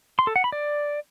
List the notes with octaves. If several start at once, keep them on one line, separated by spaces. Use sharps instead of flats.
C6
A4
F#5
B5
D5